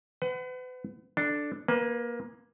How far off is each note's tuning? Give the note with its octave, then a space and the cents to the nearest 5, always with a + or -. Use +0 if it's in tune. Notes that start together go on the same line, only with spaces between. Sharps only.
B4 +40 F#5 +20
D4 +0 A4 +0
A#3 +20 B4 +0